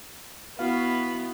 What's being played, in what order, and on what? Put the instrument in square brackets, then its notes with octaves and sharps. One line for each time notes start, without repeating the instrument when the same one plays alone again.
[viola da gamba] B3 [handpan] E4 F#4 F5